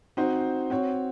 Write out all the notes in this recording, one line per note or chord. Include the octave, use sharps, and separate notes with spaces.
C4 D#4 F#4 C5
C4 F#4 C#5